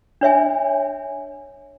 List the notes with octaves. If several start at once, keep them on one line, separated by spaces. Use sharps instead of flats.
D4 C#5 E5 G#5